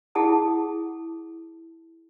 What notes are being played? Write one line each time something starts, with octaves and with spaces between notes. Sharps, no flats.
E4 G#4 F#5 A5 D#6